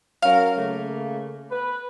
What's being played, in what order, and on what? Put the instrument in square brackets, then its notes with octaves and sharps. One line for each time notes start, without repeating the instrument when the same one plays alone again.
[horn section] F#3 C#4 A#4 [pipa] F5
[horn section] C#3 A3 A#3
B4